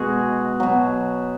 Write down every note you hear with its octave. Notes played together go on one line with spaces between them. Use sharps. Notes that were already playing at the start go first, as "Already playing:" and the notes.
Already playing: B2 G#3 F#4 G#4
B2 F#3